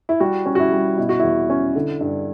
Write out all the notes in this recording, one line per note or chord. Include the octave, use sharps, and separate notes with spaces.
E4
G3 F#4
C#4
F#4
E4
G3
B2 E4
F#4
E2 E4
C#4
D3
G2